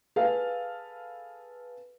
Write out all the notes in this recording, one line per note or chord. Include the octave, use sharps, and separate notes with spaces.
G#4 A4 B4 F5